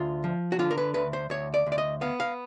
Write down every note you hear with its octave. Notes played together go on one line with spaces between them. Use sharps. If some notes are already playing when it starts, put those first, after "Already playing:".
Already playing: D2 F4
F3
F#4
D3 F4
A#4
B4
D2 B4
C5
D2 C#5
D5
D2
D5
D#5
B3 F5
F5